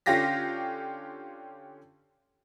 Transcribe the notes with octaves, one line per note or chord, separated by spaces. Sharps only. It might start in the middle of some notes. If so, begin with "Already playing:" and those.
D3 C#4 F4 G4 A#6 B6